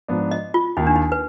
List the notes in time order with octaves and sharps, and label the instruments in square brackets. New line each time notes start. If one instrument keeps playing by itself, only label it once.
[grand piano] G#2 F3 B3 D4
[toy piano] D#5
F4
[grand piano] D#2 D#3 A#3 [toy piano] D#4
[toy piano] D4
D#4
B4